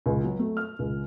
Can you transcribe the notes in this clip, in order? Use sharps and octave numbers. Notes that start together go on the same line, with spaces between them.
C#2
F#3
A3
F6
C#2